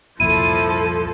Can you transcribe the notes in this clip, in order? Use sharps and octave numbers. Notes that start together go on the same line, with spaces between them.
C2 F2 A#2 F3 E4 A4 D#7